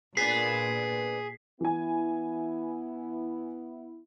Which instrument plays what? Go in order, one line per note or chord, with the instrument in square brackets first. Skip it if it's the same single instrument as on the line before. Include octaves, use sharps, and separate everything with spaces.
[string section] A#2 [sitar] B3 D4 [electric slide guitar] G#4 [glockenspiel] B6 C7
[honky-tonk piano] E3 G#5 [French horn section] B3 E4